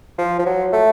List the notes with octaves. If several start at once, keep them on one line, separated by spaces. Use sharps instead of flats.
F3
F3
F#3
A3